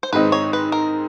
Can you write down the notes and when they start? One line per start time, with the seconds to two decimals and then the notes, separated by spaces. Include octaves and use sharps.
0.03 C5
0.13 G#2 D#3 G#3 C4 D#4 B4
0.32 C#5
0.53 B4
0.72 A#4